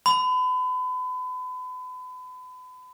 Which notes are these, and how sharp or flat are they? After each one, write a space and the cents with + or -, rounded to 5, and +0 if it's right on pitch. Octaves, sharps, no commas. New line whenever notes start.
B5 +35